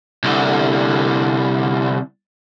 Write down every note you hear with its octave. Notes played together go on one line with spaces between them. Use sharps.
C2 D3